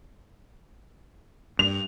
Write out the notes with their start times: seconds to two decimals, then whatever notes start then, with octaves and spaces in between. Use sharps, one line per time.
1.59 G2 F7